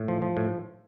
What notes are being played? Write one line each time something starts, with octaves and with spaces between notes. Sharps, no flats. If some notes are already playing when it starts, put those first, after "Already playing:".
Already playing: A2
F3
F3
A2